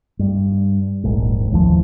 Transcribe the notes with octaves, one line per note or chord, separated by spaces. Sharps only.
G2
D#1 A#1 G#2
A1 D#2 E3 F3